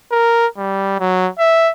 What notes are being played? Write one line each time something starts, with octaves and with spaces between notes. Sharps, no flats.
A#4
G3
F#3
E5